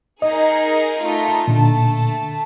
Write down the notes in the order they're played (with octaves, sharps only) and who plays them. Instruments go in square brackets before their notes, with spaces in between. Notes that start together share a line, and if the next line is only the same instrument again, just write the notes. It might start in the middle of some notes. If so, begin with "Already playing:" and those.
[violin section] D#4 G#4 A#4 [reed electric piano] D#5
[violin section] A3 D#4 F4
[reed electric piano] A#2 D3 D4 [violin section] A3 A5